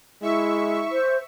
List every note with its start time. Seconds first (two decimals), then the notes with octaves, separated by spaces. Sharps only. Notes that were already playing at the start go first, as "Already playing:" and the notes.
0.22 G#3 E4 E5 C#6
0.92 C5